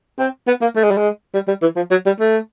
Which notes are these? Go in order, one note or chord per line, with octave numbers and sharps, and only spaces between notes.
C4
B3
A#3
A3
G#3
G3
G#3
G3
G3
E3
F3
F#3
G3
A3